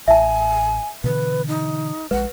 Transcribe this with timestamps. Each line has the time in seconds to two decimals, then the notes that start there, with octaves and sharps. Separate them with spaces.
0.08 A1 E5 G#5 A5
1.04 B2 D3 E3 B4
1.48 D#4
2.11 A#1 G#3 B4 F#5